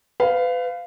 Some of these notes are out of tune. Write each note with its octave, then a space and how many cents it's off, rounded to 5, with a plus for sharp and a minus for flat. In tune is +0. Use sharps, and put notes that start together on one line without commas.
B4 +35 F5 +0